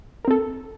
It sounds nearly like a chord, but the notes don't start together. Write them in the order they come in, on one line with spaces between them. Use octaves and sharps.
A#4 C4 A4